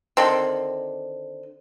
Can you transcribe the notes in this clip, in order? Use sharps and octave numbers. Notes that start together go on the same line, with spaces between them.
D3 D#3 C4